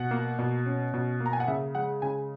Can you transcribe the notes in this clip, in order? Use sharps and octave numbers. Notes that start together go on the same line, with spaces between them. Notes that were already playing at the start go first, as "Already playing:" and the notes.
Already playing: B2 F#5
A#3
B2
C#4
B2
A#3
A#5
G#5
F#5
C#3 E5
G#3 F#5
C#3 G#5